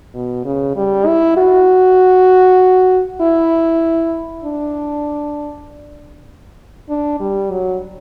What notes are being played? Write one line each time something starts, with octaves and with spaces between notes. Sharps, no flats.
B2
C#3
G3
E4
F#4
E4
D4
D4
G3
F#3